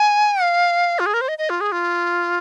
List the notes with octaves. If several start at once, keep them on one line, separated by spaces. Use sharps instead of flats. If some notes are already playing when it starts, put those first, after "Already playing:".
Already playing: G#5
F5
F4
G#4
A#4
C5
D#5
D#5
F4
G#4
F4